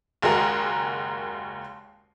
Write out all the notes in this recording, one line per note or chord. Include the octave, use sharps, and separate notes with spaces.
F#1 D#2 G#3 F#4 G#4 A#4